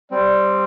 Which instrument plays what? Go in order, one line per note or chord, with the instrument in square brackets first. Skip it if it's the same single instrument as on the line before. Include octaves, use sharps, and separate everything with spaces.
[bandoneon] G3 C4 [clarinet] D5